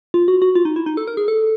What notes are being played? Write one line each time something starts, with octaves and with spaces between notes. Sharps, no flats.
F4
F#4
F#4
F4
D#4
E4
D#4
A4
A#4
G#4
A4